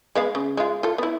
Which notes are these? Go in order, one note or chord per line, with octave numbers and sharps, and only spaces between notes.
G#3 B3 F5
C#3
G#3 F4
F4 A4
B3 E4